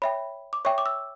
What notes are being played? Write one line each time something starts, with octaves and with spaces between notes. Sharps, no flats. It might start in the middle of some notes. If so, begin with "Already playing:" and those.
C#5 E5 G5 B5
D6
C#5 E5 G5 C#6
D6
E6